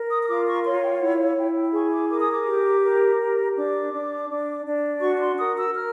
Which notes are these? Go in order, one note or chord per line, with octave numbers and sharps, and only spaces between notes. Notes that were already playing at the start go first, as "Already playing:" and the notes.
Already playing: A#4
D#6
D#6
F4 D6
C#6
C#5 C6
G5
F5
E4 F#5
F5
E4 G5
G5
G#4 C#6
D6
A#4 D6
D#6
D6
G4
A#4
G4
D4 D6
D4
D4
D4
F#4 C#6
C#6
C6
A#4 D#6
E6
A#4 F6